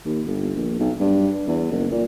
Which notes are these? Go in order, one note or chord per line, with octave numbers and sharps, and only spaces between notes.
D#2
G1
A#1
B1
G2
E2
F#1
A#2